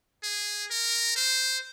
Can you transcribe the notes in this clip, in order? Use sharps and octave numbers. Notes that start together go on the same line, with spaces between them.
G#4
A#4
C5